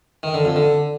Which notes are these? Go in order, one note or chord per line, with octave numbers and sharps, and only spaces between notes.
D#3
D3
F2
D3